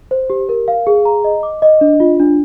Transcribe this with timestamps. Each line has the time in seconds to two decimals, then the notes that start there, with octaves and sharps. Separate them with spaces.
0.11 C5
0.30 G4
0.49 A#4
0.68 F5
0.87 G#4
1.05 A#5
1.24 D#5
1.43 D6
1.62 D#5
1.81 D4
2.00 F4
2.20 D4